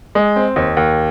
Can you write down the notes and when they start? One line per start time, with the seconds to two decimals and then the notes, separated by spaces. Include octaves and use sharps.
0.15 G#3
0.36 C4
0.56 D#2
0.77 D#2